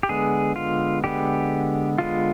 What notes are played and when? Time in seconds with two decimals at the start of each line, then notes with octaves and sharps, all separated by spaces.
0.03 G4
0.09 D3 G#3 B3 G#4
0.56 F4
1.04 D3 G#3 B3 G4
1.98 D3 G#3 B3 F4